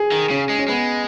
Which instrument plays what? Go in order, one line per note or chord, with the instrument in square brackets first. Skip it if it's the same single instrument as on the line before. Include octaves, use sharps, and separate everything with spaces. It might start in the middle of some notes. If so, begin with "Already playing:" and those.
Already playing: [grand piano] G#4
[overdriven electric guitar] D#3
[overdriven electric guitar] C#3 [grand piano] C#4
[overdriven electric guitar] G#3
[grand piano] C#4
[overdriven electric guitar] G#3 [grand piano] B3